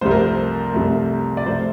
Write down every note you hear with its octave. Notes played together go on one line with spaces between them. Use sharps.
C2 C3 F3 A3 C5
A#4
C5
C2 C3 F3 A3
D5
C2 C3 F3 A3 C5